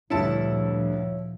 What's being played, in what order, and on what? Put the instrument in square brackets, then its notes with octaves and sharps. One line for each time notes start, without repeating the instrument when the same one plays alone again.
[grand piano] D2 G2 D3 [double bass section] A#2 F3 [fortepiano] E4 A5 [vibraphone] C#5